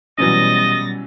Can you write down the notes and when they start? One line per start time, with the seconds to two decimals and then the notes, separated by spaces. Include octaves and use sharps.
0.18 B2 E3 F#3 G3 C#4 D#5 A6 A#6